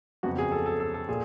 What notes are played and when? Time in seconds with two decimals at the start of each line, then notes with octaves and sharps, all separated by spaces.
0.23 F2 C#3 F#3 B3 F#4
0.38 G#4
0.52 A4
0.66 A4
0.80 A4
0.94 A4
1.08 A#2 G#4